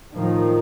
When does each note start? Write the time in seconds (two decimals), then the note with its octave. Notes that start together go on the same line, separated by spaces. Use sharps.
0.16 A2 D#3 F3